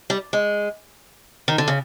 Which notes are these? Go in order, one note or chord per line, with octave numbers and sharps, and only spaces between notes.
G3
G#3
D#3
D3
C#3